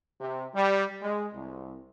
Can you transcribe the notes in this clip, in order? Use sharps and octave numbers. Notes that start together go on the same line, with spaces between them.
C3
G3
G#3
C2